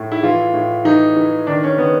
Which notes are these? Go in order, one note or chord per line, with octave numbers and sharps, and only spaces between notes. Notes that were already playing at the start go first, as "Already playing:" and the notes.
Already playing: A2
E4
E3 F4
A2
E3 D#4
E3
D#3 D4
C#4
D#3 B3